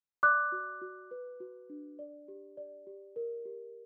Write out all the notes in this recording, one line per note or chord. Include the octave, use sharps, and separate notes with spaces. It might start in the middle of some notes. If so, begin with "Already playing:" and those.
D5 D6 F#6
F#4
F#4
B4
F#4
D4
D5
G4
D5
G4
A#4
G4